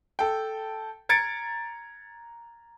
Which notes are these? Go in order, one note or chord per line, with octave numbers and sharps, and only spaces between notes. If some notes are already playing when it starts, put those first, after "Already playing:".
A4 G5
A#5 G#6 A6 C#7 D7